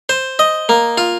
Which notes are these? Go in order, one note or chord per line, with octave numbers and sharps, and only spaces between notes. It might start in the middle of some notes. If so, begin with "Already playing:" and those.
C5
D#5
A#3
F4